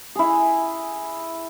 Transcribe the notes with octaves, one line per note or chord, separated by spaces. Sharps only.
E4 G#4